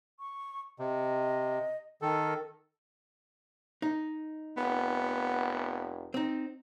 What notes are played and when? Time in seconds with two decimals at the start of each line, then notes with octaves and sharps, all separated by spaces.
0.20 C#6
0.79 C3 D#5
2.02 D#3 A4 A#4
3.82 D#4
4.57 F1 B3
6.14 C4 D#4